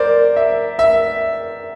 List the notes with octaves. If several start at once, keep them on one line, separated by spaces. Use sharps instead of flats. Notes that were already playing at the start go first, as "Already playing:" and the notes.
Already playing: A#4 C5 D5
E5
E5